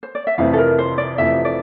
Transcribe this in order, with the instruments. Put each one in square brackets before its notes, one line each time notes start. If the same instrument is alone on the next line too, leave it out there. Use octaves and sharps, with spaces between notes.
[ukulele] C5
D5
E5
[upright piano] F1 F2 C3 E3 A3 [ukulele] F5
[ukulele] A4
A#4
C5
D5
[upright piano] F1 F2 C3 E3 A3 [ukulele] E5
[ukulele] D5